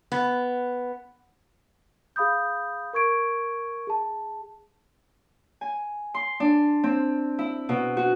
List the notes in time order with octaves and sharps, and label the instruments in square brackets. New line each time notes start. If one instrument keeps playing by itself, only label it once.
[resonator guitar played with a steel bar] B3
[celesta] G#4 F5 B5 D#6 G6
A#4 C#6 G#6 D7
G#4 A5
[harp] G#5
C6
D4
C4
E4
B2
F#4